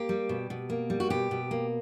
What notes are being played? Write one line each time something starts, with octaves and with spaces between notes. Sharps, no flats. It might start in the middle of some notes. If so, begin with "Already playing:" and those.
Already playing: A#3 G4
G3
B2
B2
A#3
G3
F#4
B2 G4
B2
A#3